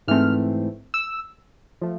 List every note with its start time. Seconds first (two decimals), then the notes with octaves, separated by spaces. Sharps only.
0.08 G#2 E3 A3 C4 F6
0.94 E6
1.81 F3 A3